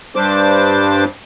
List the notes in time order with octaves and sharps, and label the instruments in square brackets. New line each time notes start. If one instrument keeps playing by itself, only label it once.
[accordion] G2 G3 D4 C5 D6